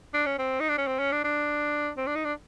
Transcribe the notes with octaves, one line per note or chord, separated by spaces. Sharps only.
D4
C#4
C4
D#4
D4
C#4
C4
C#4
D4
D4
C4
D4
D#4
D4